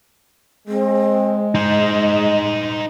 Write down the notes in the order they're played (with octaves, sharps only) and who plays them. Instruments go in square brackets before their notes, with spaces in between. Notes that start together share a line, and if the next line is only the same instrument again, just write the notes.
[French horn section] G#3 [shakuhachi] C4
[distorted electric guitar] D#4 C5 [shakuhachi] D#5